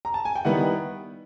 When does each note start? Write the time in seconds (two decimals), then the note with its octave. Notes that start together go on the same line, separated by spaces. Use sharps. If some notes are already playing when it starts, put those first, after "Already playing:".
0.05 A#5
0.14 A5
0.25 G#5
0.35 G5
0.45 D#3 G3 B3 E4 F#5